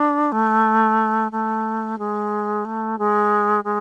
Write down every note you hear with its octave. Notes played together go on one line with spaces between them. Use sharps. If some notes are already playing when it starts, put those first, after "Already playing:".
Already playing: D4
A3
A3
G#3
A3
G#3
G#3